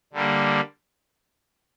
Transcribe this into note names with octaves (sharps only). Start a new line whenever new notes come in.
D3 G3 A#3